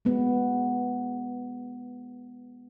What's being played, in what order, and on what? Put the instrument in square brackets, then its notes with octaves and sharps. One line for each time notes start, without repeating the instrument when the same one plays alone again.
[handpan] G#3 B3